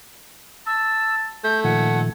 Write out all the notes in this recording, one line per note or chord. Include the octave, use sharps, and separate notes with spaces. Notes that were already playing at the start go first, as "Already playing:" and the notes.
A5 E6
A3 G6
A#2 D#3 F3 F#5 G#5